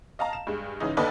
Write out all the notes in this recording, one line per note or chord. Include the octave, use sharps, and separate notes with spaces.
D#5 F5 A5 A#5
E7
G2 G#3
G#2 C#3 E3 G#3 D#4
D#2 D3 A4 B4 D5 D#5